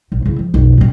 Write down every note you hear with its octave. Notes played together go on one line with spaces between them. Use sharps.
A#1
C#3 E4
F3
B1 F2
A2 C#4